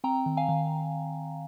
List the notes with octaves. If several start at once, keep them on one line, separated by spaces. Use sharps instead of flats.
C4 G5 A#5
D#3
F5 G#5
D#3